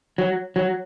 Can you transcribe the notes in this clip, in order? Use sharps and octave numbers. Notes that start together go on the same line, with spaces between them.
F#3
F#3